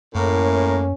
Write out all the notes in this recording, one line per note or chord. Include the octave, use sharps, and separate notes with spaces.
F#2 A2 A#3 C#4 A#4